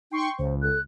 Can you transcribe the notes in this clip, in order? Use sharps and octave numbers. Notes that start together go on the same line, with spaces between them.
D#4 G5 C6 C#6
C#2 C5
A4 F#6